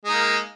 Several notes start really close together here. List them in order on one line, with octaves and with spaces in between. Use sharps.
G#3 D#4 A#3